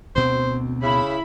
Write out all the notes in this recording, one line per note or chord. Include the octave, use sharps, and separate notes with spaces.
D2 B2 C4 C5
C#3 E4 B5